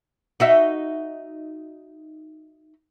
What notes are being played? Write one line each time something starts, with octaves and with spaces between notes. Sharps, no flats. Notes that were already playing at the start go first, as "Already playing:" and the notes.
D#4 F#4 E5